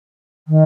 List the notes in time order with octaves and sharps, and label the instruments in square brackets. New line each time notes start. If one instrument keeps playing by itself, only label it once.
[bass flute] D#3